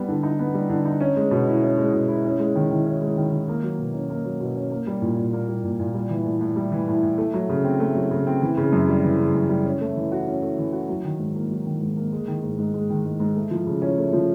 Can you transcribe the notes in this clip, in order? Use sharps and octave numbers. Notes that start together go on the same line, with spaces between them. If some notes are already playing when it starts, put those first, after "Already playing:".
Already playing: G3 B3
D3
D#4
B3
G3
D3
D#4
C#4
G#3
B2
E4
C#4
G#3
B2
E4
C#4
G#3
D#3
D#3
C#4
G#3
D#3
D#3
A#3
F#3
B2
C#4
A#3
F#3
B2
C#4
A#3
G3
A#2
A#2
A#3
G3
A#2
A#2
G3
E3
A2
A2
G3
E3
A2
A2
A3
F#3
C#3
C4
A3
F#3
C#3
C4
E3
C#3
F#2
G3
E3
C#3
F#2
G3
C#4
A3
E3
F#4
C#4
A3
E3
F#4
F#3
D#3
G#2
A#3
F#3
D#3
G#2
A#3
G#3
D#3
G#2
G#2
G#3
D#3
G#2
G#2
A3
F3
C#3
C#4
A3
F3